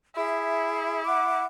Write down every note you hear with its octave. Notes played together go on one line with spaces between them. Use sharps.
E4 G#4 E5
E5 F#5 D6